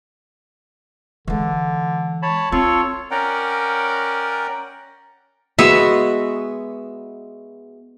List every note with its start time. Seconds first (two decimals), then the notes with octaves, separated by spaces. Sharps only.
1.28 D3 E3 G#3
2.23 C#5 A5 B5
2.52 C4 F4 A4 C#5 C#6
3.11 C#4 A#4 D5 F#5 G5 A#5
5.59 G#3 B3 F#4 E5